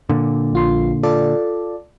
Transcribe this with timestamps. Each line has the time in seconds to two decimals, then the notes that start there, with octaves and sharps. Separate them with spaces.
0.09 A#2 D3
0.53 A#1 F4 C6
1.03 F4 A4 D5